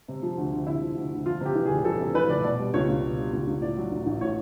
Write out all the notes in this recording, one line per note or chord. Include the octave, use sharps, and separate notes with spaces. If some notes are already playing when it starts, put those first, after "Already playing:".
C3
F3
D2
D2
C3 E4
F3
D2
D2
F2 F4
C3 G4
E3
F1 G#4
F2 A4
C3
E3 B4
F1 D5
B2 D5
G3
C#2 C#5
C#2
B2
G3
C#2
C#2
A2 D5
F#3
A1
A1
A2 C#5